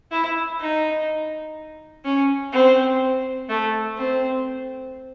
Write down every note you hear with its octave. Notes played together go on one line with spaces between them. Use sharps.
E4
D#4
C#4
C4
A3
C4